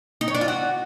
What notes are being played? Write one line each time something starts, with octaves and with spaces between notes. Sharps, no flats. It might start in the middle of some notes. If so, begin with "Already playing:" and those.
D#4
C#5
D4
F4
F#4